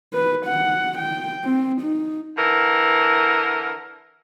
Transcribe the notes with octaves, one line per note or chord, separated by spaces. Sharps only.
B4
F#5
G5
C4
D#4
D3 E3 A#4